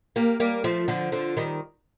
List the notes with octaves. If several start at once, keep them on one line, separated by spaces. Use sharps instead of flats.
G3 A#3
G3 A#3
F3 A3
D3 F3
D3 F3
D#3 G3